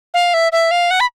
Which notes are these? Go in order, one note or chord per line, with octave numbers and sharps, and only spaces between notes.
F5
E5
E5
F5
F#5
B5